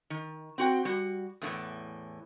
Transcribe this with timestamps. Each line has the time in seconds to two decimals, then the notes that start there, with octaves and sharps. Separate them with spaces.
0.10 D#3
0.58 C4 F#4 G5
0.85 G3 F#4
1.42 E2 A2 E3